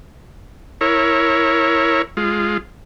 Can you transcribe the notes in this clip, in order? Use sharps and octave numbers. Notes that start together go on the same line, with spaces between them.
E4 A#4 C#5
G#3 F4